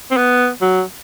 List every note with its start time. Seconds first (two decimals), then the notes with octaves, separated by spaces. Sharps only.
0.11 C4
0.17 B3
0.61 F#3